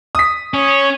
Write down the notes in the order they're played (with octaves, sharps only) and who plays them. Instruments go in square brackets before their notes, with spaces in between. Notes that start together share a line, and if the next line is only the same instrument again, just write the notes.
[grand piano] D#6 B6
[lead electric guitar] C#4 [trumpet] C#5